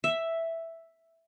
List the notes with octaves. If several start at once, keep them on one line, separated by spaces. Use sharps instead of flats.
E5